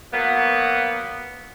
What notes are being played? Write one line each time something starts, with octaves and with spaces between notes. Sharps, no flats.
F#3 A#3 B3